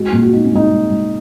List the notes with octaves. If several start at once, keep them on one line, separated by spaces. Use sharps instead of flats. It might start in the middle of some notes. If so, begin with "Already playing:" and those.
Already playing: G#3 F#4
A#2
F#4
G#3 D#4
C#4
G#3 D#4
G#3
G#3